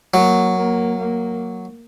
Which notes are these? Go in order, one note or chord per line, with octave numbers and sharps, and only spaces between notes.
F#3 A#3
A#3
A#3